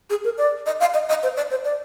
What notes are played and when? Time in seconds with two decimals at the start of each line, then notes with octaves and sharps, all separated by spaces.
0.10 G#4
0.24 A#4
0.38 D5
0.66 D#5
0.80 F5
0.94 D#5
1.09 D#5
1.23 C5
1.37 D5
1.51 C5
1.65 D5